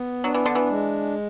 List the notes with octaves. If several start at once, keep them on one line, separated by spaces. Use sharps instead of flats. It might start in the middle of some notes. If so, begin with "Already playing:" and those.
Already playing: B3
F#3 D4
E3
D3
E3
G#3